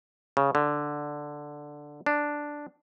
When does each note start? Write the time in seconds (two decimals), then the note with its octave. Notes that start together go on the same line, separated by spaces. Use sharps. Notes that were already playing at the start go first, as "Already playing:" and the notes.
0.37 C#3
0.55 D3
2.06 D4